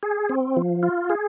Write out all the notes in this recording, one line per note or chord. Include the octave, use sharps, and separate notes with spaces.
G#4
C4
F3
F4
G#4